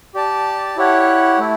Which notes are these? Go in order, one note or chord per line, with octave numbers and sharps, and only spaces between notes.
G4 D5 A5
E4 G4 C#5 F#5
A3 E4